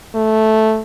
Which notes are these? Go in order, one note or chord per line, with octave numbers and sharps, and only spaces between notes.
A3